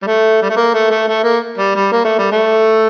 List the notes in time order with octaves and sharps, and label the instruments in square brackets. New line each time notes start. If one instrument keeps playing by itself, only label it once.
[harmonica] G3
A3
G3
A3
A#3
A3
A3
A3
A#3
G3
G3
A#3
A3
G3
A3